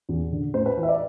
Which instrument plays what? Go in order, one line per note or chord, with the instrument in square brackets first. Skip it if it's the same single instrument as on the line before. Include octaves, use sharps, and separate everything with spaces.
[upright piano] E2
D3
A2 C5
B4
E3 B4
E5
D5